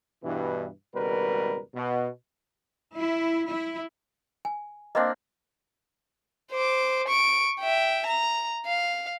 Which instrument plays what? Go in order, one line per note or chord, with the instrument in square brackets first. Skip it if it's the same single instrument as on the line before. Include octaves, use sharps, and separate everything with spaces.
[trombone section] G2 B2 E3
G#1 C#2 B2 G3 A#4 B4
B2
[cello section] E4
E4
[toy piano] G#5
[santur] A#3 C4 D4 [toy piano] D#5
[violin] C5 D6
C#6 D7
E5 G5
A#5
F5